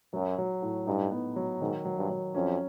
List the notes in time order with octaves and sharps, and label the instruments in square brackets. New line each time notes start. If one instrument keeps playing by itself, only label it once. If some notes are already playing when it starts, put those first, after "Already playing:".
[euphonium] F#2 [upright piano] F#3
[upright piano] F#3
A2
[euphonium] G2 [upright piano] D#4
[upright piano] B3
F#3
[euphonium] G#2 [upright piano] D#3
[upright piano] F#3
[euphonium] G2
[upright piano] F#3
[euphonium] F2 [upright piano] C#4